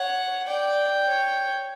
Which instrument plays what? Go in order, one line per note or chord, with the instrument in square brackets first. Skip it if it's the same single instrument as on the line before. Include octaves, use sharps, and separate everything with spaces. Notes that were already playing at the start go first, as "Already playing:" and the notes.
Already playing: [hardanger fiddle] C#5 [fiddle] F#5
[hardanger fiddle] D5 [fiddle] G5
[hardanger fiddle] C#5